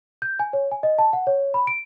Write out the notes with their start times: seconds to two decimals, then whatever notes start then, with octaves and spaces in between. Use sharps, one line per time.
0.22 G6
0.40 G#5
0.53 C#5
0.72 G#5
0.83 D#5
0.98 A5
1.13 F#5
1.27 C#5
1.54 B5
1.67 D7